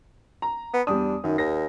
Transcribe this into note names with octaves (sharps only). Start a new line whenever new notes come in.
A#5
B3
E2 G3 D4 D#6
F#2 D#3
D#2 A#6